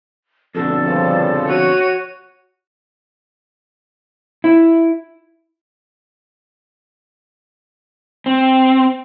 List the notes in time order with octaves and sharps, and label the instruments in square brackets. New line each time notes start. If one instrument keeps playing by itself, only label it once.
[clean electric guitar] F2 B2 D3 [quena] A4
[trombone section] G2 C#3 F3
[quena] F#4 [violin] C#5 D#7
[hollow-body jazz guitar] E4
[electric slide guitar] C4